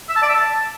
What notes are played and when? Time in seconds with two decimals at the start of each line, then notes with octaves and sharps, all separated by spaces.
0.09 E5
0.16 A5
0.22 D5
0.29 E5
0.35 A5